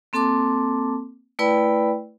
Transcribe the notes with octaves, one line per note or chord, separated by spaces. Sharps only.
A#3 C4 A4 A5 C6 D6
A3 E4 B4 D5 G5 B5